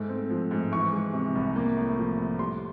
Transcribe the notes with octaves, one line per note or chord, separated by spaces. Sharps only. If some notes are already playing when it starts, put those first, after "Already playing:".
Already playing: G#2 A3
C4
F3
G#2
E3 C#6
G#3
C3
C2
A#3
A2
F3
A2
G3 C6